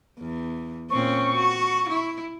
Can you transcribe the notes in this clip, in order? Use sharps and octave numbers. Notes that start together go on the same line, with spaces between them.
E2
A#2 C4 C#4 C#6
F#4
E4